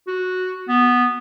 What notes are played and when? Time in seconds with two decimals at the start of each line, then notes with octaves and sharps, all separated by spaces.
0.07 F#4
0.68 B3